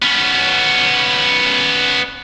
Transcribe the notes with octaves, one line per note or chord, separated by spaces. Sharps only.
B3 C#4